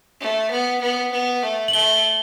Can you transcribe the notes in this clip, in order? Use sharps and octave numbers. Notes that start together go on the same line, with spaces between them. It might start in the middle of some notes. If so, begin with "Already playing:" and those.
A3
B3
B3
B3
A3
F#7
A3 G7